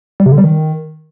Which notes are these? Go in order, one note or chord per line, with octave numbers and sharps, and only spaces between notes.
G3
C3
D3
G3
D#3